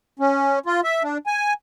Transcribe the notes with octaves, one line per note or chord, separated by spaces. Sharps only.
C#4
F4
E5
D4
G#5